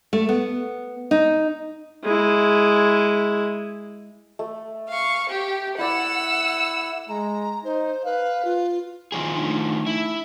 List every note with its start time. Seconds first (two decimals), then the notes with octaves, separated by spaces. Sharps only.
0.13 A3
0.29 B3
1.11 D#4
2.03 G#3 E4
4.39 A3
4.89 F5 C#6
5.29 G4
5.78 E4 D5 F#5 E6
7.09 G#3 A#5
7.65 D#4 C5
8.05 B4 F5
8.45 F4
9.12 D#3 F3 G#4
9.36 A3 D4 D#4
9.86 E4